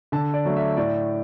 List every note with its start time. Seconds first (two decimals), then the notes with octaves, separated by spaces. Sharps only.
0.12 D3 A5
0.34 D5
0.45 F#3 A3
0.56 E5
0.77 A2 D5